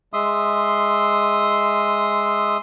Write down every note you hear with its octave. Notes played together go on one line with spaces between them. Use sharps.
G#3 E5 C6 D#6